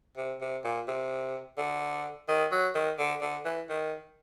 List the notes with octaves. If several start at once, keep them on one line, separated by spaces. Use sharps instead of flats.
C3
C3
A#2
C3
D3
D#3
F#3
D#3
D3
D3
E3
D#3